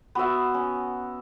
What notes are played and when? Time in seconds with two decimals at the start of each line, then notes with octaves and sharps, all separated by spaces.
0.15 B3 F#4 E5
0.54 C#4